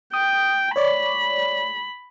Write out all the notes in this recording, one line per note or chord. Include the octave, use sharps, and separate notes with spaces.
G5 D#6
C#5 D5 B5